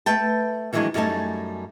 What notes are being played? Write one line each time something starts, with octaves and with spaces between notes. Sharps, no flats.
A3 B4 G5 A5
D#3 E3 F#3 G#3 A#3 D4
F#2 G3 A3 D#4 G#5 A5